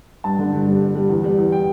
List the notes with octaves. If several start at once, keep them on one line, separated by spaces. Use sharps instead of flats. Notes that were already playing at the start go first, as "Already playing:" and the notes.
G2 A5
D3
G2
G3
G3
G3
E2
G3
E2
G5